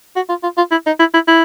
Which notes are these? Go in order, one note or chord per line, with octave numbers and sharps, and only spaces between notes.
F#4
F4
F4
F4
E4
D#4
E4
E4
E4